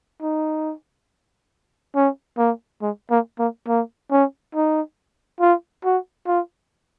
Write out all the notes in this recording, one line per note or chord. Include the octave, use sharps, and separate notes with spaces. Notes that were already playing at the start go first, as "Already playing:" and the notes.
D#4
C#4
A#3
G#3
A#3
A#3
A#3
C#4
D#4
F4
F#4
F4